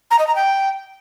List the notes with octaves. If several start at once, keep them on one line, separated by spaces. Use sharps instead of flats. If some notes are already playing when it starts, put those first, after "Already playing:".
A#5
D#5
A#5
G5